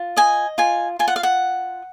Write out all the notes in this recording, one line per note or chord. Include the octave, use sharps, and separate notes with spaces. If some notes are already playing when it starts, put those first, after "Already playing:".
Already playing: F4
D#5 G#5
F4 G#5
F4 G#5
F#5
F5
F#5